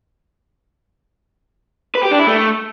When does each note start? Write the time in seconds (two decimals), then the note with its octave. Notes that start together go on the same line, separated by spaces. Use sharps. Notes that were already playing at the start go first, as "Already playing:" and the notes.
1.95 B4
2.03 G4
2.11 D4
2.19 E4
2.27 A3